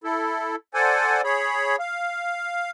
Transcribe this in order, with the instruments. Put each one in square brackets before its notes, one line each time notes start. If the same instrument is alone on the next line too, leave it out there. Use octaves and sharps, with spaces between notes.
[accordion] E4 A4
A4 C5 D5 F#5 G#5
G#4 C#5 B5
F5